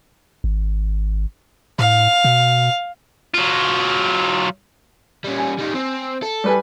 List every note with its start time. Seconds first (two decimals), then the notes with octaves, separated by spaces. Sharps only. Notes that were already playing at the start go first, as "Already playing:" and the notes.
0.44 G#1
1.79 A2 F5
2.24 B2
3.34 F#3 F4
5.24 G3 C#4
5.38 G#5
5.59 G3 D#4
5.75 C4
6.23 A4
6.44 G3 B4 G#5